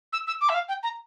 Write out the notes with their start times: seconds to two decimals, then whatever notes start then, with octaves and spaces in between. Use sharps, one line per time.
0.12 E6
0.27 E6
0.41 D6
0.49 E5
0.54 F5
0.68 G5
0.83 A#5